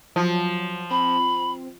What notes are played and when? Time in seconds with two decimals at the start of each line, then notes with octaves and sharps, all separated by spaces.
0.16 F3 F#3
0.91 C4 B5